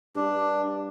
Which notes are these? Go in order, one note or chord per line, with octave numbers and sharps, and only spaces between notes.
G2 D4